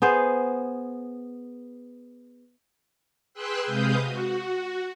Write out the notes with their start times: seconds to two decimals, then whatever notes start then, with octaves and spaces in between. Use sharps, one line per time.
0.02 B3 G#4 C5
3.34 G#4 B4 G5 C6 E6 F#6
3.66 C3 G#3 B4 F5 D#6 G6
4.03 F#4